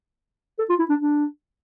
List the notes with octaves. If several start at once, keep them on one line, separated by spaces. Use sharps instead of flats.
A4
F4
E4
D4
D4